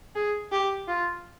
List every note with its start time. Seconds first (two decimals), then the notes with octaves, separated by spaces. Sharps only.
0.15 G#4
0.52 G4
0.88 F4